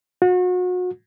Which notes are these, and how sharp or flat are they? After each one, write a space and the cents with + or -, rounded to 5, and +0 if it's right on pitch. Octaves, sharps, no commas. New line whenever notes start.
F#4 -35